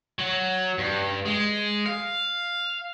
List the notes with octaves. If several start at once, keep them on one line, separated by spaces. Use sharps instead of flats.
F#3
G2
G#3
F5